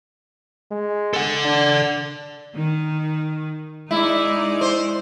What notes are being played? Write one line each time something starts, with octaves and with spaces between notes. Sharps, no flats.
G#3
A4 F#5
D4
D#3
G#3 D#4 E4 D5
C5